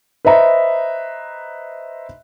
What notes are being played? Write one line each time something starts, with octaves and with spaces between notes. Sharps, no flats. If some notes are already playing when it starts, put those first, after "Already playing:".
B4 C5 D#5 E5 A#5